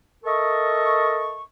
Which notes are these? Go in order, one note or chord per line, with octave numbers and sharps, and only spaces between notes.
A4 A#4 D#5 E5 A5 C#6